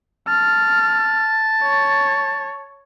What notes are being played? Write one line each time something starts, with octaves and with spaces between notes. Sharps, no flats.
A5 F6
C#5